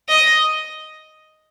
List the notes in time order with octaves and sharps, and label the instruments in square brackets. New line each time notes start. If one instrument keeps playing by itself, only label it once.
[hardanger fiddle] D#5